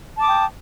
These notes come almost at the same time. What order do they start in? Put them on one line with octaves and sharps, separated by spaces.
A5 D6 D#6 G5